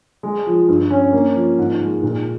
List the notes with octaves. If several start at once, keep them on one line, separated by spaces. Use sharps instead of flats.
G#3
F3
G2
C#4
A#3
F3
G#2
G#3
A#2